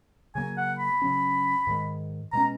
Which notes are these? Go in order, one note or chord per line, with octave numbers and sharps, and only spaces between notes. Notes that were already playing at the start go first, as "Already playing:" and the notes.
C#3 F#3 A#3 G#5
F#5
B5
C#3 F#3 C#4
G#2 D#3 G#3
B2 G#3 C#4 A#5